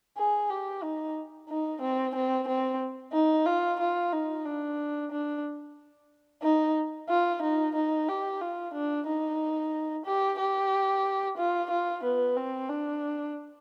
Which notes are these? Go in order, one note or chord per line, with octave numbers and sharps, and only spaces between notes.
G#4
G4
D#4
D#4
C4
C4
C4
D#4
F4
F4
D#4
D4
D4
D#4
F4
D#4
D#4
G4
F4
D4
D#4
G4
G4
F4
F4
B3
C4
D4